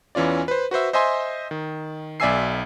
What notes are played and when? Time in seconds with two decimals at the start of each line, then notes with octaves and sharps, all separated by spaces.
0.15 E2 E3 C#4 F4 D5
0.48 B4 C5
0.71 F#4 B4 C5 E5
0.93 C5 D#5 E5 G#5 C6
1.51 D#3
2.20 B1 D5 E5 G#5 E6 C7